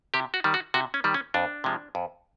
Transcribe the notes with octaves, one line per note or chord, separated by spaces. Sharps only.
C3 G4
F#4
D#3 G3
F#4
C3 F#4
C#4
D#3 G3
C#4
F2 D4
C3 F3 G#3
F2